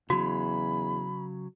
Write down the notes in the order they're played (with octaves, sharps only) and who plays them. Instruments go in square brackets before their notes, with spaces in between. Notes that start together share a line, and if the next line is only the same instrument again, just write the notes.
[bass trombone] E2 [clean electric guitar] C#3 F#3 [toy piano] F#4 [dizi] B5